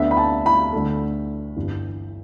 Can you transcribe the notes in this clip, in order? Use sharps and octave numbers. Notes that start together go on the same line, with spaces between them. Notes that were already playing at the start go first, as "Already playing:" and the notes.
Already playing: D2 D3 B3 D4 E5
B5
A5
B5
D2 D3 A3
G1 G2 E3